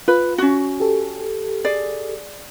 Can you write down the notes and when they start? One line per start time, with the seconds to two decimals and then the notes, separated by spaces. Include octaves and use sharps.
0.08 F4 B4
0.38 C#4 F#4
0.80 G4 A4
1.64 G#4 D5